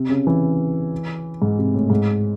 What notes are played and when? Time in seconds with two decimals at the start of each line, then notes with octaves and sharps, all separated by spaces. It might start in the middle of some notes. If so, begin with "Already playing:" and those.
Already playing: C3
0.09 C#3
0.27 E3
1.42 G#2
1.58 C3
1.74 A2
1.90 G#2